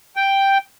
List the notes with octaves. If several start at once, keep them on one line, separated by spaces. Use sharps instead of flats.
G5